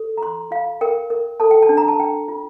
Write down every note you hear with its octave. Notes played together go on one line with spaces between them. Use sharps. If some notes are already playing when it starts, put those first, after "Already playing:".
Already playing: A4
A#5
F4 C6
F4 F5
A#4 G5
A#4
A4 A5
G5
A5
D4
A#5
A5
D4 G5
F4